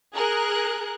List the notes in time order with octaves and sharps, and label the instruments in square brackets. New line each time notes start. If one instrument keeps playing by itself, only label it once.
[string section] G#4 A#4 F#6